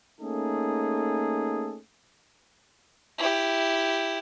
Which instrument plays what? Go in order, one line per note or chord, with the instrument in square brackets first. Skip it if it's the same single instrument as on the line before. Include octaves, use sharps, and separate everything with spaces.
[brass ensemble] A3 A#3 C#4 D#4 G#4 A4
[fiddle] E4 G4